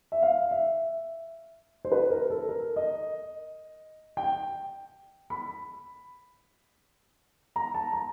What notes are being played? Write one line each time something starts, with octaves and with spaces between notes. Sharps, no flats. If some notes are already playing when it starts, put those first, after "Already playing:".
E5
F5
E5
C5
B4
A#4
A4
A#4
D#5
G5
B5
A#5
A5
A#5